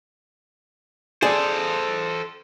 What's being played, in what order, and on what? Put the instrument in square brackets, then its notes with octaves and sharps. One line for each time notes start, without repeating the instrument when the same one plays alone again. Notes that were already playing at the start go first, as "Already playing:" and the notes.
[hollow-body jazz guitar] G#4 D5 [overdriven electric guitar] A4 C5